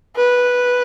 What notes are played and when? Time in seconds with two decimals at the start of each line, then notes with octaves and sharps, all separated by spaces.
0.16 B4